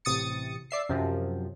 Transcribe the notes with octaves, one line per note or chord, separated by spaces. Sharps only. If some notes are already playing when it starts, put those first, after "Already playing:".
A1 C3 D#6 A6 C#7
D5 E5 C7
F#2 C3 F3